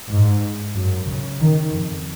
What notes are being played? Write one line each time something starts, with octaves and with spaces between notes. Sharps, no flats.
G#2
F#2
C#3
D#3
F2